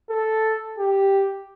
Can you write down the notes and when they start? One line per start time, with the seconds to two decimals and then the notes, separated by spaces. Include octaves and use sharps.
0.10 A4
0.79 G4